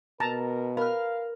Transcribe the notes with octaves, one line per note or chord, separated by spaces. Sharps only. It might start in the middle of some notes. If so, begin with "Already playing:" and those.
B2 A#4 A5 A#5
A#4 B4 F5 F6